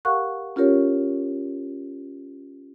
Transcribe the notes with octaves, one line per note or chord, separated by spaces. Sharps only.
G4 A#4 F5 F#5 C#6 F#6
C#4 F4 G4 A#4 C#5